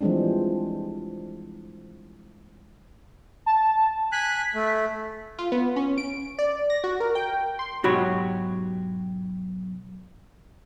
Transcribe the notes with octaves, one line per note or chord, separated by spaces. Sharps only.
E3 F3 G3 G#3 C4 D4
A5
G#5 F#6 B6
A3
F4
B3
C#4
D7
D5
A#6
F#4
A#4
G5
C6
B1 G#2 F#4 G4 C#5 B5